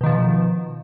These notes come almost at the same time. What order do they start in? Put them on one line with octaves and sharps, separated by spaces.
B2 D#3 F3